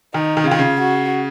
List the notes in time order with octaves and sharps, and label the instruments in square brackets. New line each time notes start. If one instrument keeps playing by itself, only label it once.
[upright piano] D#3 [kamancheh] D#4
[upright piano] D#3
C#3
[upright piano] D#3 [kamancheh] F4
[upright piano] C#3
[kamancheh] F#4